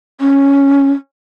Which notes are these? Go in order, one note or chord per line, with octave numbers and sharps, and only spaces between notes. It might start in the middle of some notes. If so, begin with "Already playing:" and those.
C#4